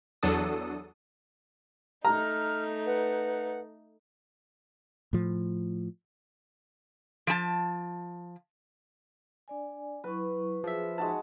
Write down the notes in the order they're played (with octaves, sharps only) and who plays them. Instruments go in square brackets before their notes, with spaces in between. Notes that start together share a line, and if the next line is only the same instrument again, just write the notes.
[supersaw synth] E2 F#3 D4 A4 D#6
[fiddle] A3 D#4 [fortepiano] A#5 [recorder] F6
[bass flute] B4 [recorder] F#5
[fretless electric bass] A2 F3
[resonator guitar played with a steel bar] F3 A5
[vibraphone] D4 D5 G#5
[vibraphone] F#3 E4 C#6 [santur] B4
[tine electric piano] F3 E5 [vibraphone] G#4
[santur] G#3 F#4 A5 [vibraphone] D#4 C6